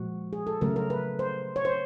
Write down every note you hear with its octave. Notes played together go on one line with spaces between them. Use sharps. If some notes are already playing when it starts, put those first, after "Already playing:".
Already playing: A#2 F3 G#3 F#4
G#4
A4
C#3 F#3 A3 A#4
A#4
B4
C5
C#5
C5